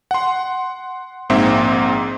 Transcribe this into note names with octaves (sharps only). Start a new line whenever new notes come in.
F#5 C6
A#1 G#2 A#3 C4 E5